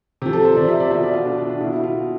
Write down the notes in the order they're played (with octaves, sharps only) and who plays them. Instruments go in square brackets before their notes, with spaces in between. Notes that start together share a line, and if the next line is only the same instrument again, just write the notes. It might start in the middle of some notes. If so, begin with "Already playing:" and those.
[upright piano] C3 G4
F3
A4
C5
C3 F3 D5
E5
D5
B2 E5
D5
F4
B2 D4
D4
D4
B2 E4
E4
F4
B2